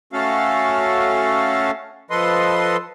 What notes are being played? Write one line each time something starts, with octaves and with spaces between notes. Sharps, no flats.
A3 C#4 F#4 A4 F5
F3 A4 B4 D#5 C6